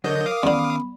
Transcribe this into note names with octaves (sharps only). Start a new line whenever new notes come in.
D3 F#3 A#4 C5 C#5 D#5 G6
F5 D6 D#6
E2 D3 D#3 B3 C#4 B5